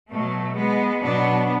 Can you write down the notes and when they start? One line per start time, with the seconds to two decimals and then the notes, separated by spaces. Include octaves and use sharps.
0.11 B2 F#3 A3
0.57 G#3 B3
1.02 B2 F#3 B3 D4